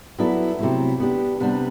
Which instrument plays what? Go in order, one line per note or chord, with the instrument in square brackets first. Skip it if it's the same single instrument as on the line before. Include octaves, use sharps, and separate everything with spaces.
[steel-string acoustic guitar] F#3 B3 E4 A4 D5
C3 F#3 A3 E4
B3 D4 G4
C3 G3 B3 D4